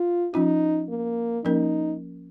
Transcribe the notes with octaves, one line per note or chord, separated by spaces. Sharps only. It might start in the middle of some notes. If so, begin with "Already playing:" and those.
Already playing: F4
F3 C#4 D#4 F4
A#3
F3 A#3 C#4 D#4 A#4